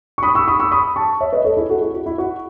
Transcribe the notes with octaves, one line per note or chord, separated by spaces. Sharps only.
C#6
B5 D#6
C#6 E6
B5 D#6
C#6 E6
B5 D#6
A5 C#6
C#5 E5
B4 D#5
A4 C#5
E4 G#4
F#4 A4
E4 G#4
F#4
E4
F#4